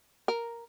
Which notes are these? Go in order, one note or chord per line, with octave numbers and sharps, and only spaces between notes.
A#4